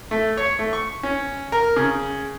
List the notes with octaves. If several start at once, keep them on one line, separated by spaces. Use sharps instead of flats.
A3
C#5
A3
C#6
C#4
A#4
C#3